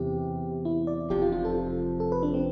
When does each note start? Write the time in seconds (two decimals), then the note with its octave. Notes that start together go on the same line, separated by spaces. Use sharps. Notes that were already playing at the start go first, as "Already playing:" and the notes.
Already playing: E2 C3 E3 G4
0.65 E4
0.87 D5
1.10 F1 F2 C3 F3 G4
1.22 F4
1.32 F4
1.45 A4
2.00 A4
2.12 B4
2.23 D4
2.34 C4